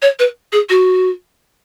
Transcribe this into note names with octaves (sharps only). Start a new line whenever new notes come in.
C#5
B4
G#4
F#4